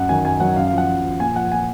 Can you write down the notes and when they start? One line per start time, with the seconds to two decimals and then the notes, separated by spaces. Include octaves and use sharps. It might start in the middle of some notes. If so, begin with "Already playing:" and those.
Already playing: F#2 F#5
0.09 D#3 F#3 G#5
0.25 F#2 G#5
0.40 D#3 F#3 F#5
0.56 F#2 F5
0.67 F5
0.72 F3
0.78 F#5
0.88 F#2
1.04 F3
1.20 A#2 G#5
1.36 F3 F#5
1.52 A#2 G#5